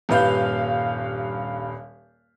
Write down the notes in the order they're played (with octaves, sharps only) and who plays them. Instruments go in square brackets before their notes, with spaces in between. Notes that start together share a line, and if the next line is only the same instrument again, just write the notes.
[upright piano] D#1 G2 B4 F5 G6